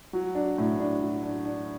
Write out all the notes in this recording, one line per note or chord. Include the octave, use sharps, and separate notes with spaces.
F#3
D4
A2
D4
F#3
D4
D4